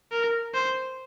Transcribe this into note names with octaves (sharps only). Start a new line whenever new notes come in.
A#4
C5